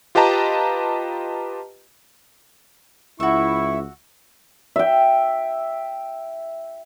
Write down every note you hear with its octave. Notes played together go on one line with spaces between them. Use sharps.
F4 G4 B4 D#5 A5 A#5
C#2 E4 F#4 E5 C#6
E5 G5